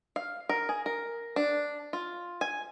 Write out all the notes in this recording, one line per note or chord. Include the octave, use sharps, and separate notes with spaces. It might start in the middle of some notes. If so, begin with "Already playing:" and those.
F5
A#4
G#4
A#4
D4
F4
G#5